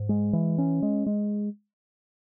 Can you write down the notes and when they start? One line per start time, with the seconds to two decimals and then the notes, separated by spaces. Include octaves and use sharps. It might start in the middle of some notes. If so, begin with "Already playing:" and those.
Already playing: G#2
0.09 G#3
0.33 E3
0.58 C#4
0.82 G#3
1.06 G#3